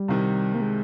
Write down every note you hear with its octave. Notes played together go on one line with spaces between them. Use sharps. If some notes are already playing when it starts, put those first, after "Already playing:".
Already playing: G3
C2 C3 D#3
A#3
G#3